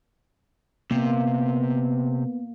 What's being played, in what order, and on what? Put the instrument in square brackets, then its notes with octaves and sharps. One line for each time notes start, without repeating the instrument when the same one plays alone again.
[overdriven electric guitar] C3 [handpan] A#3 [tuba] B3